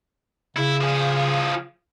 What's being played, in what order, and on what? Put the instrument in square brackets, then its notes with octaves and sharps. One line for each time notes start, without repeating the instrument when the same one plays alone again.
[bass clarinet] C#3 [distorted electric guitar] E4
[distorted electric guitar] F3 G#4